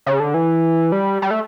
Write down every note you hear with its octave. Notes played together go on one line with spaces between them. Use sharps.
C#3
D3
E3
G3
G3
A3